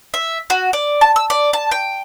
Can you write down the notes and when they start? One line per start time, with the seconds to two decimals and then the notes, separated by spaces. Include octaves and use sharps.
0.14 E5
0.50 F#4
0.73 D5
1.01 A5
1.16 E6
1.30 D5
1.53 A5
1.71 G5